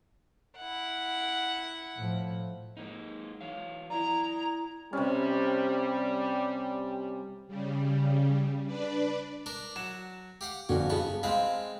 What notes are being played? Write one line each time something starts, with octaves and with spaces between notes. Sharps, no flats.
E4 F#5
A2 F3
G#3 A#3 D#4
E3 C#5 F5
E4 D5 A#5
C3 G3 C#4
C#3 G3
D4 B4 D5
D4 A#4
F#3 E7
G4 F5 F#5
G1 F2 D3 C#4 F#4
G2 C#3 G#3 B3 A5 C#6
G#3 C4 B4 F5